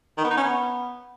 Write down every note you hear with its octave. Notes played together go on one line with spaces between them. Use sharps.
D#3
B3
D#4
C#4
B3